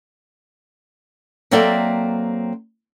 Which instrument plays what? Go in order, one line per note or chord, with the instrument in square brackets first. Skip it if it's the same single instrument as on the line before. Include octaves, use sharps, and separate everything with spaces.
[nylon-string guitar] F#3 A#3 C4 A4 D5 E5